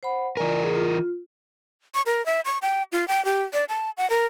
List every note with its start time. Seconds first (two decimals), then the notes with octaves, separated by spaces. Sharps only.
0.03 C5 F#5 B5
0.37 E3 F4 A#4 D5 G#5
0.63 G#4
0.75 F4
1.95 C#6
2.06 A#4
2.26 E5
2.45 C#6
2.62 G5
2.92 F4
3.08 G5
3.25 G4
3.53 D5
3.69 A5
3.97 F#5
4.10 A#4